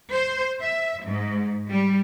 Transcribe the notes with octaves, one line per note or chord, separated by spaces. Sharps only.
C5
E5
G#2
G3